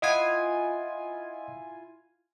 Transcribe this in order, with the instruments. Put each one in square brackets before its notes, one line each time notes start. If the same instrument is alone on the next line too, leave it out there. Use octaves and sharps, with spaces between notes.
[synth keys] E4 F4 G#5 [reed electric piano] D#5 F#5 D#6